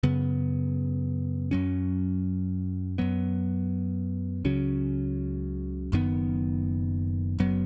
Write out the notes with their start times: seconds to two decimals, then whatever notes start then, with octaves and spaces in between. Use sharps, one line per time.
0.03 F#2 C#3 B3
1.51 F#2 F#3 C#4
2.98 F#2 F#3 B3
4.45 C#2 C#3 F#3 C#4
5.92 F#1 F#2 D#3 B3
7.39 F#1 F#2 F#3 B3